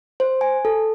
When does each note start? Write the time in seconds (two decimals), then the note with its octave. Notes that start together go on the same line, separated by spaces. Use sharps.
0.20 C5
0.41 G#5
0.65 A4